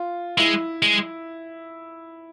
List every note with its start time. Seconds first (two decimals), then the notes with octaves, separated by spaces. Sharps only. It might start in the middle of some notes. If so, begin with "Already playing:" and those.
Already playing: F4
0.38 G#3 E4
0.83 G#3